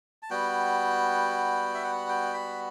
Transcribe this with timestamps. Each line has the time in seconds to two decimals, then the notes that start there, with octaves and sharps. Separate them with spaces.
0.23 A5
0.30 G3 B3 F#4 G5
1.74 E5
1.84 F#5
2.09 G5
2.34 B5